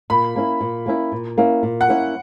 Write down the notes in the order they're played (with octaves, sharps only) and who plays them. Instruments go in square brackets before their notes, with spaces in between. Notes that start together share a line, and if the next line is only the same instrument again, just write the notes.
[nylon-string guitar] A#2 [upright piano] B5
[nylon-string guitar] A#3 C#4 E4
A#2
A#3 C#4 E4
A#2
A#3 C#4 E4
A#2
[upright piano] F#5
[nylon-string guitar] A#3 C#4 E4